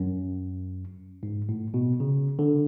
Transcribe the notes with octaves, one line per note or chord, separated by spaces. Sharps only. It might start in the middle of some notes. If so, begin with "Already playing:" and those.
Already playing: F#2
G#2
A2
B2
C#3
D3